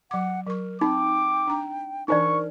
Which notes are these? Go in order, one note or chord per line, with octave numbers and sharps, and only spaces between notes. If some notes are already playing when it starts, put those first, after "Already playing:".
F#3 F#5 D6
F#3 A#4 C#6
C4 D#4 G5 B5 D6
D4 A#5
E3 D4 D#4 A#4 C5 D5 G#5 C#6